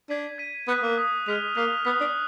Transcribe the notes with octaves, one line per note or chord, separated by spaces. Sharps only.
D4 G#6 B6 D#7
G#6 B6 D#7
B3 D#6 F#6 B6
A#3
D#6 F#6 B6
G#3 F6 B6 F7
A#3 F6 B6 F7
B3 D#6 F#6 B6
D4